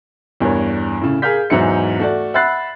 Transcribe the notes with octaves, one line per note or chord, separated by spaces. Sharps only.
E2 G2 A#4 C#5
A2 C#3
G#4 A#4 F5 F6 G6 B6
E2 G#2 E3 F#3 E5 C#7
A3 F#4 D5
E5 F#5 B5 F#6 A6 C7